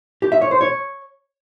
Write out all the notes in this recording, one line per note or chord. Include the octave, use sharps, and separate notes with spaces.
G4
E5
C#5
C5
C#5